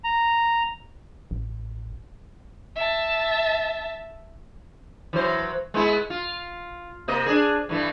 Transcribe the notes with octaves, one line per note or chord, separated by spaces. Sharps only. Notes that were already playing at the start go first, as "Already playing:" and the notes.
A#5
A1
E5 A5
E3 F#3 C5
G#3 B3 E4
F4
C3 A#3 D#5
D4 G#4
G2 E3 A3